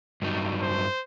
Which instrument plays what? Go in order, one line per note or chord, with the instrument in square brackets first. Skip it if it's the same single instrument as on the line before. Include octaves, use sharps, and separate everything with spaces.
[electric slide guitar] G2 F#3 D#4
[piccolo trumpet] C5